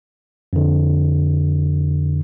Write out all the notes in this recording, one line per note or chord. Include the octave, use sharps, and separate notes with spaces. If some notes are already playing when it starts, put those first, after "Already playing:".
F2 D3